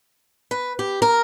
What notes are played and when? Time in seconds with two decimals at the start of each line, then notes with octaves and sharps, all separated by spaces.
0.51 B4
0.79 G4
1.02 A#4